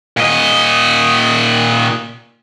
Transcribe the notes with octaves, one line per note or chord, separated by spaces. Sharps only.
A#2 D#5